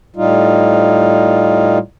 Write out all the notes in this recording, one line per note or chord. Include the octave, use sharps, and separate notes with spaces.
A2 G3 D#4 F4